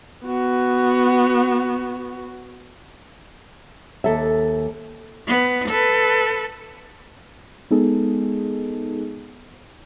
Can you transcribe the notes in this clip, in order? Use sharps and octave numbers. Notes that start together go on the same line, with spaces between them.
B3 F#4
D#2 A4 E5
B3
A4 B4
G#3 B3 D#4 G#4 A4